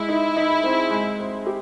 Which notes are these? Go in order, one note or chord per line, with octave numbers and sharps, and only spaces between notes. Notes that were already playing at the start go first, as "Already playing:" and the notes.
Already playing: G#3 E4
D#4
D#4
C4
G#3
C4
G4